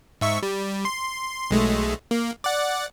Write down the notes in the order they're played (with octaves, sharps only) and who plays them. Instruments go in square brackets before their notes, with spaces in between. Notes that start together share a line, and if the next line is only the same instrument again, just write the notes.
[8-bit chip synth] G#2 E5 C#6
G3
C6
B1 G#3 A3
A#3
D5 F#5